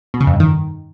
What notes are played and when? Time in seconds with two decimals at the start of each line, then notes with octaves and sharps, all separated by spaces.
0.14 B2
0.20 C#3
0.27 F2
0.33 G2
0.40 D#3